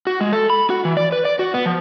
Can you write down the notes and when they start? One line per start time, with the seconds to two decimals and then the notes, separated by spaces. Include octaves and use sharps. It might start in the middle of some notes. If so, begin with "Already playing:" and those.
0.07 F#4
0.21 G#3
0.33 A4
0.50 B5
0.70 F#4
0.85 E3
0.97 D5
1.12 B4
1.25 D5
1.39 F#4
1.54 B3
1.66 F3